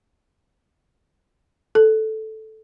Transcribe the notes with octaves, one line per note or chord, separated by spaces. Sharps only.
A4